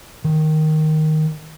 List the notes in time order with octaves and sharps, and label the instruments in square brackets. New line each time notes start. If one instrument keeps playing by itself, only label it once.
[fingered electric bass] D#3